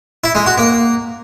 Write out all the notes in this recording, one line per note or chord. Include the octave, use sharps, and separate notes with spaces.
E4
G#3
F#4
A#3